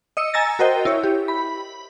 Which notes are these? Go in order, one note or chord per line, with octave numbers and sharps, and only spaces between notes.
D#5 E6 C#7
G#5 A#5 E6 A6 A#6
F#4 A#4 C5 D#5 G5
E4 C#5
G4
B5